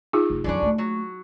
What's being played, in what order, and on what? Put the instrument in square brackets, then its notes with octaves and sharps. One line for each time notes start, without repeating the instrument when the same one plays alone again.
[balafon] D#4 F4 G#4
[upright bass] F1
[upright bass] F#2 D#3 [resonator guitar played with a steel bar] D3 C#4 D4
[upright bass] A3 A#3
[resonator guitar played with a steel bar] F#3